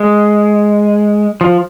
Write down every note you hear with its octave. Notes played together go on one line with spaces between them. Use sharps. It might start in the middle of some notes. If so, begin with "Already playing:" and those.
Already playing: G#3
F3